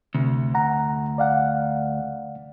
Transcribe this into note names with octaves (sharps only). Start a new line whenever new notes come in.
D2 C3
F#5 A#5
D5 F5 F#5